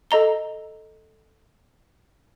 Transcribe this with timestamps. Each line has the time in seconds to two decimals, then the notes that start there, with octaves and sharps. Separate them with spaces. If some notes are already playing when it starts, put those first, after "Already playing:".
0.11 A4 D#5 A#5 G7